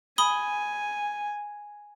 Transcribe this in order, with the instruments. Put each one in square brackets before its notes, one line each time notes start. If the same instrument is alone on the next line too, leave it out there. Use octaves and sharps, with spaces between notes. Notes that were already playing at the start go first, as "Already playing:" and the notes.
[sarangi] G#5 [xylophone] B5 D#6 G7